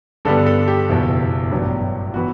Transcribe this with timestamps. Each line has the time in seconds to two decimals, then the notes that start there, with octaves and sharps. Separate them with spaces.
0.25 G2 D3 G3 B3 A4
0.46 A4
0.68 G4
0.89 F#1 E2 B2
1.51 A1 G2 F#3 B3 D4
2.14 E3 B3 E4 F#4